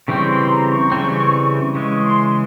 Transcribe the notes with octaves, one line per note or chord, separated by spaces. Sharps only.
C#3 E3 G3 C4 C#6
C6
A#5
C#6
C#3 E3 G3 C4
C#3 E3 G#3 C#6
C#6
C6